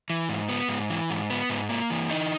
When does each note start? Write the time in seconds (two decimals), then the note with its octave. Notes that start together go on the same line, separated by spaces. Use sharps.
0.10 E3
0.29 G#2
0.49 B3
0.69 G#2
0.90 E3
1.10 G#2
1.30 B3
1.50 G#2
1.69 A#3
1.90 E3
2.10 D#4